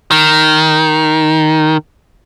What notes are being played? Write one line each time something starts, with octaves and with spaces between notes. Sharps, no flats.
D#3